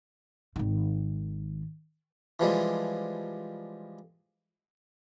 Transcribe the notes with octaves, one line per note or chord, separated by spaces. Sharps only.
G#1 D#3
E3 F3 G3 G#3